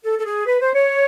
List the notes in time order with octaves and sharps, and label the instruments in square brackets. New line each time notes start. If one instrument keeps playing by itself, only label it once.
[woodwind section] A4
A4
G#4
B4
C5
C#5